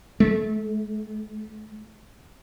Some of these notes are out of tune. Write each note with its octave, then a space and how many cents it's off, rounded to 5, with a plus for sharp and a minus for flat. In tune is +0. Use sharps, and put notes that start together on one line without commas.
A3 -30